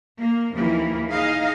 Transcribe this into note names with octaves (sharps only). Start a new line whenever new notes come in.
A#3
D#2 E3 F3 A#3
D#4 G#4 D#5 F5